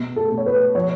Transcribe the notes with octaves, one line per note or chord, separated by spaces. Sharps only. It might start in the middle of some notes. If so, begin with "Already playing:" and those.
Already playing: B2
A4
B2
C#5
B4
F3 C#5